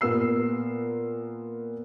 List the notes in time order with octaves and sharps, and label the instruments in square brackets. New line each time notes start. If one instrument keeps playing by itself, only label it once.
[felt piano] A#2 B3 A#4 E6 C7